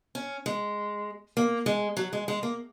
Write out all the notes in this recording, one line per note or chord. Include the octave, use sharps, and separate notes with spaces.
C#4
G#3
A#3
G#3
F#3
G#3
G#3
A#3